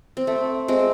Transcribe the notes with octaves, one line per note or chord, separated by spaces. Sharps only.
C4
A3
G#3 C4